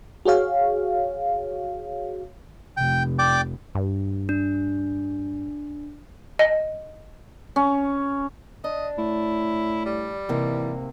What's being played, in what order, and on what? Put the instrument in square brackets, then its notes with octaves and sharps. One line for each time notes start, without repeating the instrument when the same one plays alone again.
[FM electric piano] F#4 G#4 C#5 F5
[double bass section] F1 [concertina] G5
[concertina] D5 G5 D6
[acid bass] G2
[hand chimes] D4
[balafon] D#5
[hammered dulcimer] C#4
[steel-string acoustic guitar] D4 [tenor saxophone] D#5
[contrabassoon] A2 [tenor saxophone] E4
[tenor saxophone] G3
[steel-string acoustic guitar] G#2 C3 A#3 [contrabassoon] E3